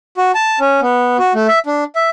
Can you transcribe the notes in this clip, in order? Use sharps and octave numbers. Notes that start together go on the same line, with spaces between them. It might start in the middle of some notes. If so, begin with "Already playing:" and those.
F#4
A5
C#4
B3
F#4
A3
E5
D4
E5